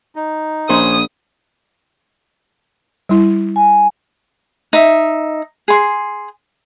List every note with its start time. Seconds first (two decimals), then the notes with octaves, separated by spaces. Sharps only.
0.16 D#4
0.69 A#1 C#4 C5 D#6
3.09 G3 E4
3.56 G#5
4.73 D#4 E5
5.68 G#4 C6